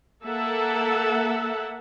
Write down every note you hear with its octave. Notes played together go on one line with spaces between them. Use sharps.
A#3 A4 E5 F#5